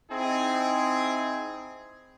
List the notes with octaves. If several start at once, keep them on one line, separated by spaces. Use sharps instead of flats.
C4 D#4 E4 G#4